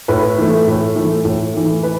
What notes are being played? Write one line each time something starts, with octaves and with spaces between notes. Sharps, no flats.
A2 B4
E3 A3
A2
E3 A3
A2
E3 A3
B4